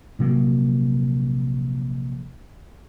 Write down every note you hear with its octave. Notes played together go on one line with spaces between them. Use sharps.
A#1 C3 F#3 A#3